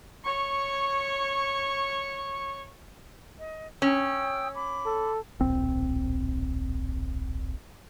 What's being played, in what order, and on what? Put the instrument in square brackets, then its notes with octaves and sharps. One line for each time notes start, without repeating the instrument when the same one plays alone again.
[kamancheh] C#5 C#6
[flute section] D#5
[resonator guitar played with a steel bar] C#4 [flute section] G5 D#6 E6
[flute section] B5 D6
[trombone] A4
[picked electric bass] D1 A#1 C4